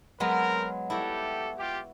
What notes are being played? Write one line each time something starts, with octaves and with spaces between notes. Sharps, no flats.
F#3 G#3 B3 C4 A#4
G3 E4 F#4 G4 A4
F4 G4